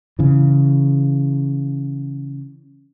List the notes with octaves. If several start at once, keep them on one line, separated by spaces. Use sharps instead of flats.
C#3 E3